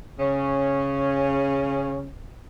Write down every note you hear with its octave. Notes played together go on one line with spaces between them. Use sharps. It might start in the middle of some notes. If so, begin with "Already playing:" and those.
C#3 C#4